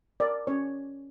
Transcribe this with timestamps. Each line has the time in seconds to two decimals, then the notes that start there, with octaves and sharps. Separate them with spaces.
0.20 A#4 D5
0.47 C#4 C#5